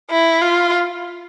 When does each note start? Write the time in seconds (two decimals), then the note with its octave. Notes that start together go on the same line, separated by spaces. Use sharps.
0.11 E4
0.41 F4